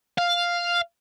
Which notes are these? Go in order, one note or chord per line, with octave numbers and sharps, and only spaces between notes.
F5